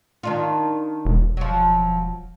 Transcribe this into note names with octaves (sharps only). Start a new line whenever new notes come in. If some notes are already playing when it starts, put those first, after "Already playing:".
D#3 D4 F4
E1
F3 F#3